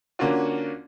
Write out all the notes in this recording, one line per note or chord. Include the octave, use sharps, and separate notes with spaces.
D3 A#3 C#4 D4 F4 F#4